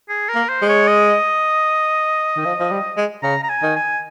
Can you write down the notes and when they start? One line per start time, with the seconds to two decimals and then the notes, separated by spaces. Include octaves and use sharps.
0.09 G#4
0.29 A#4
0.35 A#3
0.49 C5
0.62 G#3
0.69 C#5
0.88 D#5
2.37 D#3
2.45 F3
2.60 F3
2.71 G3
2.97 G#3
3.23 C#3 A#5
3.44 A#5
3.49 G#5
3.63 D#3
3.76 G#5